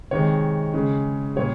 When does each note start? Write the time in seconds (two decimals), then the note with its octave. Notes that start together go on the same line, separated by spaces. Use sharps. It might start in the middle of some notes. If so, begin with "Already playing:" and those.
0.11 C3 D#3 G#3 C#5
0.74 C#3 G#3
1.36 A#2 G3 C#5